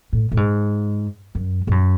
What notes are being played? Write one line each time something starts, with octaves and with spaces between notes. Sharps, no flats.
A2
A2
G#2
F#2
G#2
F#2